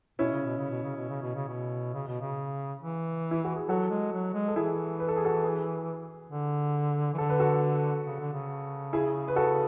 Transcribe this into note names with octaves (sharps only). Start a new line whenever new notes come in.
B2 C#4 E4
C#3
B2
C#3
B2
C#3
B2
C#3
B2
C#3
B2
C#3
B2
C#3
E3
E4
F#4
G#4
F#3 F#4 A4
G#3
F#3
G#3
A4
E3 E4 G#4
B4
A4
G#4
F#4 A4
G#4 B4
D3
E3
D3 A4
B4
F#4 A4
C#3
D3
C#3
E4 G#4
B4
F#4 A4